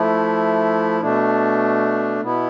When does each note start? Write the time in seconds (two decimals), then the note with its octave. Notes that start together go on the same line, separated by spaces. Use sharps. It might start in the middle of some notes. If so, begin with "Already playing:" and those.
Already playing: F3 A3 E4
1.01 B2 A3 D4
2.21 B2 B3 E4